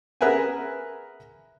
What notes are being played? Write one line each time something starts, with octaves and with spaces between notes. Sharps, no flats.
G#4 A#4 B4 E5 F#5 G#5